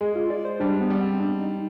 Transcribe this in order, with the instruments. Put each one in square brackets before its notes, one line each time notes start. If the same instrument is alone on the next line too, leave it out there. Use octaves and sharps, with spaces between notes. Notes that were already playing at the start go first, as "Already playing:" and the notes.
[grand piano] G#3 [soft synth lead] G#4
[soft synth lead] F4
D5
C5
[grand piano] G3 [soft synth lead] D4
[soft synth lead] B3
[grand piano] G3
[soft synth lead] C4
D4
D#4